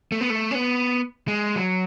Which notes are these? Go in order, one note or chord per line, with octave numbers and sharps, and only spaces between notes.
A3
B3
A3
C#4
B3
G#3
F#3